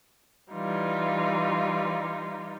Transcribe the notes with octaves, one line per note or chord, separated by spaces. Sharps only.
E3 G3 D#4 F4